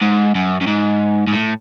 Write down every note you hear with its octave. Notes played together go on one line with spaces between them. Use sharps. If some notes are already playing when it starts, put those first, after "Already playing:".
G#2
F#2
F#2
G#2
G#2
A2